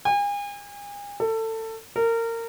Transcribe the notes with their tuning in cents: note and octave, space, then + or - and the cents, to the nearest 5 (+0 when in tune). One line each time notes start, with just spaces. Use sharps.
G#5 -40
A4 +25
A#4 -25